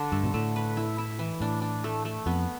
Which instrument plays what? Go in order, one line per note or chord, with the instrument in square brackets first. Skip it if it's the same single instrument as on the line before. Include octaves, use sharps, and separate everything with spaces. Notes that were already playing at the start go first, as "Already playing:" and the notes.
Already playing: [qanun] D3 D4
[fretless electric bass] G2 [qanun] A3
[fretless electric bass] B2
[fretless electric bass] A2 [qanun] A3
[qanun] B4
E4
E4
E3
[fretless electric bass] A2 [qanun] D4
[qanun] D4
A3
A3
[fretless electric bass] F2 [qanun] B3